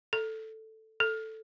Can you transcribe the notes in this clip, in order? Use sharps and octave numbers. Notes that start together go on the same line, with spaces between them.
A4
A4